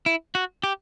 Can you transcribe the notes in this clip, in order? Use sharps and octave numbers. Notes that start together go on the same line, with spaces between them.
E4
F#4
G4